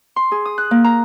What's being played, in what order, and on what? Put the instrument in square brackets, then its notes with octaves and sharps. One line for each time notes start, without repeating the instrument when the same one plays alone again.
[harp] C6
G#4
D#6
F#6
A#3
A#5